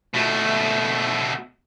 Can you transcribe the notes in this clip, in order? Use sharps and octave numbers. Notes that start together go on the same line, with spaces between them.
B2 A3